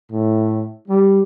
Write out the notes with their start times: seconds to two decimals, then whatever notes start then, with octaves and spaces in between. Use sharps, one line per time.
0.12 A2
0.87 G3